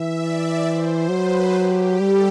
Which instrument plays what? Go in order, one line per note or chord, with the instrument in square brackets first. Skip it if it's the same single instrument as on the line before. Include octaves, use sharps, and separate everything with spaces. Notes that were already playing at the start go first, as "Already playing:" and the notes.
Already playing: [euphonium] E3 [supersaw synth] E5
[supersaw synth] D5
C5
[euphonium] F#3 [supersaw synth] B4
[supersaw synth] G4
[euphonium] G3 [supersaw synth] A4